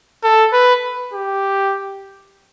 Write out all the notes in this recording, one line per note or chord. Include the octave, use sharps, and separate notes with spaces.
A4
B4
G4